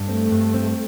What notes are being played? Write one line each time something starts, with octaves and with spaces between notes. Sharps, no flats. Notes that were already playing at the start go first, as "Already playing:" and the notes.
Already playing: G2
A3 C4
G2
C4